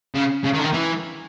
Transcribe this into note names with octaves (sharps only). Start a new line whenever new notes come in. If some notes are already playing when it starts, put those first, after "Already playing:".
C#3
C#3
D#3
D3
D#3
E3